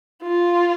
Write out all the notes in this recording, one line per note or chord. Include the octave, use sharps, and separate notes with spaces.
F4